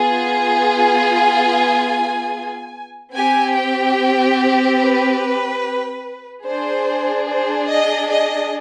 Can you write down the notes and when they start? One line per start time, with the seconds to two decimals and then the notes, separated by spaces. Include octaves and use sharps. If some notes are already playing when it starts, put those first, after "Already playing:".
Already playing: B3 F4 G#4 G#5
3.14 C4 G4 G#5
3.55 G5
4.80 B4
6.45 D4 G#4 C5
7.28 C5
7.70 D#5
8.11 D#5